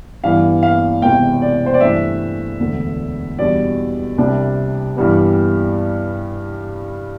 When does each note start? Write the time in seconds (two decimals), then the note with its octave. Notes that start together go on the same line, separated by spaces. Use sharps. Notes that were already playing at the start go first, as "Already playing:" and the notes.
0.23 G2 E3 B3 F5
0.63 F5
1.02 E1 E2 C3 G5
1.42 D5
1.66 C5
1.74 D5
1.81 G2 E3 A3 D4 E5
2.60 E1 D2 D3
3.39 E2 B2 G3 D4 D5
4.18 C2 C3 G3 D4
4.96 G2 E3 G3 B3